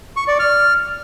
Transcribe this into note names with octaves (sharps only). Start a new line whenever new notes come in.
C#6
D5
F6